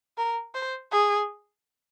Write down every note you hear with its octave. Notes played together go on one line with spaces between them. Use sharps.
A#4
C5
G#4